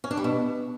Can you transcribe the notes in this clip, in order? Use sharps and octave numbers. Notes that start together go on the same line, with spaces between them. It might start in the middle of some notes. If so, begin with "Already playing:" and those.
C#4
D4
G3
B2